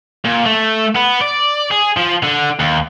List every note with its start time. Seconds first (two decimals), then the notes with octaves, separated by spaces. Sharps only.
0.25 A#2
0.46 A3
0.95 B3
1.21 D5
1.71 G#4
1.97 F3
2.23 D3
2.60 D#2